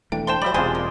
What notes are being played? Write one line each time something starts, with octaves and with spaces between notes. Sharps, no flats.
E1 E3 A3 D4 G5
D4 C5 G5 A5 C6
F#3 G#3 G4 C5 D5 E5 B5
E1 C3 G#3 F4 G4 G#4 C5
A#3